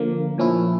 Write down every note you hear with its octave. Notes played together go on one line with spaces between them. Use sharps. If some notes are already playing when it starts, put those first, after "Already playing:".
Already playing: D3 F3 A#3
A#2 F3 C#4 E4